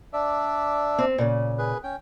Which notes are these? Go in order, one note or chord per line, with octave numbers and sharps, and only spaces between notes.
D4 D5 E5
C4
A#2 C#3
G#4 B4
C#4 G5